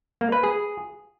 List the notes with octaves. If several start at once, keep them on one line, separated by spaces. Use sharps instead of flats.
A#3
B4
G#4